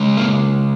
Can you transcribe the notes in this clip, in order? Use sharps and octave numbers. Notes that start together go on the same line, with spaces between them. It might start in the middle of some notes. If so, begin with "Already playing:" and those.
Already playing: C#3 G#3
A#3